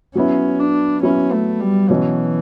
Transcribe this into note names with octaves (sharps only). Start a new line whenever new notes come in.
F#3 B3 C#4 E4
D4
F#3 B3 C#4 E4
A3
G3
B2 E3 F#3 C#4